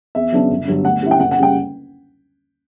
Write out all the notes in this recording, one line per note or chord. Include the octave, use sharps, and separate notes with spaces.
E2 E5
C#3 F#3 B3 D4
G1
G2 D3 F#3
D2 F#5
D3 G3 C#4 E4
G5
F#1 F#5
F#5
C#3 G3 G5